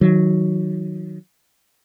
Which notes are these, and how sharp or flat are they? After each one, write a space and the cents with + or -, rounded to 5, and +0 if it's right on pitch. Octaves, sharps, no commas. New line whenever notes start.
D#3 +25 F#3 +0